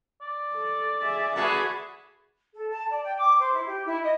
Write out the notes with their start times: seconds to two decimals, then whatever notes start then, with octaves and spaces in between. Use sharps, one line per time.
0.22 D5
0.53 A4
1.01 G#4 E5
1.36 A3 F#4 G#4 B4 F#5
2.53 A4
2.69 A5
2.89 D5
3.03 G5
3.17 D6
3.39 C5
3.52 E4
3.65 G4
3.86 E4
4.03 D#5